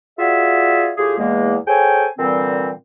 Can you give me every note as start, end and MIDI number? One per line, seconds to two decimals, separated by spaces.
0.19 0.92 65
0.19 0.92 66
0.19 0.92 68
0.19 0.92 74
0.19 0.92 76
0.97 1.15 45
0.97 1.15 65
0.97 1.15 67
0.97 1.15 68
1.19 1.57 40
1.19 1.57 56
1.19 1.57 58
1.67 2.07 68
1.67 2.07 69
1.67 2.07 72
1.67 2.07 73
1.67 2.07 79
1.67 2.07 80
2.19 2.72 46
2.19 2.72 50
2.19 2.72 52
2.19 2.72 55
2.19 2.72 60